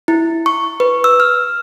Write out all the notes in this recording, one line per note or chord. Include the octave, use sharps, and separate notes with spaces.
E4
C#6
B4
E6
F6